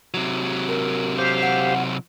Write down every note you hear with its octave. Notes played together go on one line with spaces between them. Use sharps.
C3 F#3
A#4
G4 C5 F5
F#5